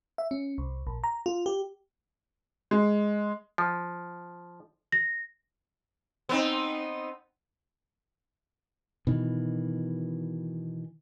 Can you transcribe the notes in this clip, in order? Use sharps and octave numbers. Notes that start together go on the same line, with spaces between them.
E5
C#4
C2
A#1
A#5
F4
G4
G#3
F3
A#6
B3 C4 D#4
B2 D#3 E3